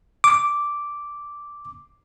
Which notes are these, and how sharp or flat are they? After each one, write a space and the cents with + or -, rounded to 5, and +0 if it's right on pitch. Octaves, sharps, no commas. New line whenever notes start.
D6 -5